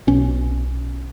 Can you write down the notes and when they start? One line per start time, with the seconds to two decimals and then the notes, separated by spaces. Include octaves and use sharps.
0.07 B1 B2 C#4